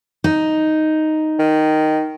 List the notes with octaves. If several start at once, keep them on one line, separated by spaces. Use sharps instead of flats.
D#4
D#3